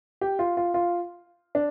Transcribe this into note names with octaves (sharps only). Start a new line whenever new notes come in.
G4
F4
F4
F4
D4